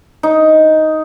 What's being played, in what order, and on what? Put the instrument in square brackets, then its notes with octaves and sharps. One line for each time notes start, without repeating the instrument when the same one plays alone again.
[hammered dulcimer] D#4